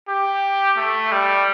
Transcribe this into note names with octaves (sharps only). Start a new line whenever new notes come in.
G4
A3
G3